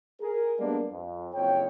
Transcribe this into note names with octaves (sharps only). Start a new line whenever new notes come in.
G#4 A#4
G3 G#3 A#3 B3 D4
F2
F#1 F2 C#5 G5